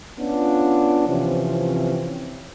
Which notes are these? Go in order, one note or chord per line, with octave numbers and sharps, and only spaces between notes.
B3 C#4 D4 F4
C3 E3 F3 C4 C#4